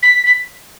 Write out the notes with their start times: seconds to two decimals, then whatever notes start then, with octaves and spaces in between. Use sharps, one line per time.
0.03 B6
0.26 B6